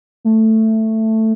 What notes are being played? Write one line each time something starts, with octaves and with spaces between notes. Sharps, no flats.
A3